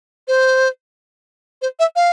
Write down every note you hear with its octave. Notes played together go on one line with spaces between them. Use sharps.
C5
C5
E5
F5